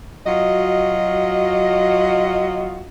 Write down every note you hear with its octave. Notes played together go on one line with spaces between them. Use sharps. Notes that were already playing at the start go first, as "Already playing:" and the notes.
F#3 F4 F#4 D#5